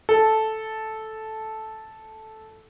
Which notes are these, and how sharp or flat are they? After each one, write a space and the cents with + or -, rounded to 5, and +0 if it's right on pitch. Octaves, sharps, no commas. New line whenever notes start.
A4 -10